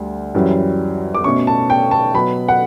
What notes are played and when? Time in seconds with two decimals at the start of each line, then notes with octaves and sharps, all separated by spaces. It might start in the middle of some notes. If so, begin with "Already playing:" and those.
Already playing: D2 D3 G3
0.35 F#2 E3 G3 C#4
1.15 D6
1.24 B2 A3 C#4 C#6
1.47 A5
1.70 G5
1.91 A5
2.14 B2 F#3 B3 B5
2.48 F#5